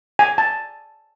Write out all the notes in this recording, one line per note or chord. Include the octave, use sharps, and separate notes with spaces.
G#5
A5